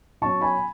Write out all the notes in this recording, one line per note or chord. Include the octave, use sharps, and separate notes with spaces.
B2 F#3 C#4 A5 C#6
G#5 B5